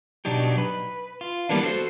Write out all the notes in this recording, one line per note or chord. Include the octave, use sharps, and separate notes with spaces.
B2 F#3 D4 D#4 G4
B4
F4
E3 G3 A#3 B3 D4
F#4 A4 C5